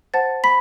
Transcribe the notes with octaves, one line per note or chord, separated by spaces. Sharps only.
C5 F#5 A5 A6
B5 B6